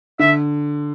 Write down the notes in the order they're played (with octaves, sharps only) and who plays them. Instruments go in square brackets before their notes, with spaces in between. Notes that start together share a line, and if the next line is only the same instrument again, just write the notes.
[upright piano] D3 [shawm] E5